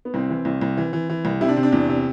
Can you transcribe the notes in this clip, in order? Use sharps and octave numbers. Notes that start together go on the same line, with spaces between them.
B3
C2 C4
E3
C2
C2
E3
E3
E3
C2
C3 E4
D4
C3 C4
D4
E2
C3